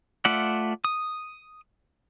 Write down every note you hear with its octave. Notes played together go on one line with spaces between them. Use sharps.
A3 F4 D5 E5 F#5
D#6